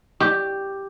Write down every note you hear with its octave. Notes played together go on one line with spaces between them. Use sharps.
G4